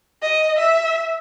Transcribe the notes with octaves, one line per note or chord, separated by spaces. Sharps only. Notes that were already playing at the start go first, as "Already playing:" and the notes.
D#5
E5